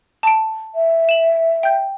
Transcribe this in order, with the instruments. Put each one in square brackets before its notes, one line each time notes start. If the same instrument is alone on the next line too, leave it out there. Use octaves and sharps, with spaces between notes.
[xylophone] A5 D7
[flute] E5
[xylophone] E7 F#7
G5 G6